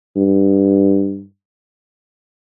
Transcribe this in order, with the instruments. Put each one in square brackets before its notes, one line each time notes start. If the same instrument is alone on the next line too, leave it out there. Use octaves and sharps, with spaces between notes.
[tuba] G2